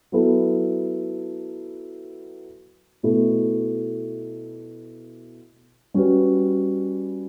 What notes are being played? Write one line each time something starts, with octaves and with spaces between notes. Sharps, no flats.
F#3 B3 E4 A4
B2 A3 E4 A4
G3 C#4 F#4 B4